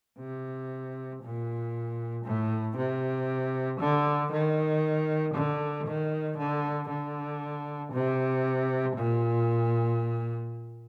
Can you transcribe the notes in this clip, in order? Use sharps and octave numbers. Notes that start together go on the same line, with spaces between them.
C3
A#2
A2
C3
D3
D#3
D3
D#3
D3
D3
C3
A#2